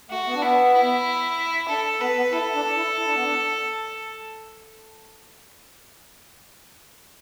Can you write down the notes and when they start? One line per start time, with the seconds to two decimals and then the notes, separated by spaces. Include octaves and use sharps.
0.10 A3 F#4
0.27 B3
0.35 D4
0.42 B3 E4
0.74 E4
1.69 D4 A4
2.01 B3 B4
2.17 B3
2.32 E4 A4
2.55 D4
2.76 E4
2.97 E4
3.06 D4
3.15 B3
3.23 D4